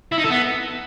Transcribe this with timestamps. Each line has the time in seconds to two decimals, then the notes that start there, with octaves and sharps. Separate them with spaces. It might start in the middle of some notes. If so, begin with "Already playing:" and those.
0.12 E4
0.18 D#4
0.24 A4
0.30 B3